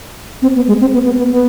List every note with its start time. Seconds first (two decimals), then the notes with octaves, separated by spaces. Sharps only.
0.42 C4
0.56 B3
0.68 G#3
0.81 C4
0.93 B3
1.05 B3
1.18 B3
1.31 B3